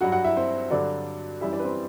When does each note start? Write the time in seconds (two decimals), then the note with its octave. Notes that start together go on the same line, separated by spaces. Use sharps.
0.01 G2 F#3 F#4 F#5
0.12 F#4 F#5
0.24 E4 E5
0.37 C4 C5
0.71 G2 D3 F#3 D4 D5
1.41 F#2 E3 G3 E4 E5
1.53 D4 D5
1.60 B4
1.64 C4 C5